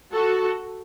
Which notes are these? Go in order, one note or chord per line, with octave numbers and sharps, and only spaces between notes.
F#4 A4